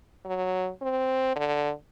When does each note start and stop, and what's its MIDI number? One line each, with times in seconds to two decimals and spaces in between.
0.25 0.69 54
0.82 1.31 60
1.36 1.71 50